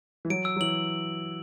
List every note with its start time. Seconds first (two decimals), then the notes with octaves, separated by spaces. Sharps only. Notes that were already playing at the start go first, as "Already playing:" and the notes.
0.25 E3
0.30 F#3 D7
0.45 E6
0.56 F#3
0.61 E3 F#7